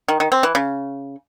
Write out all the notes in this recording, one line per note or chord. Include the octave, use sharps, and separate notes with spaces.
D#3
D#3
C4
E3
C#3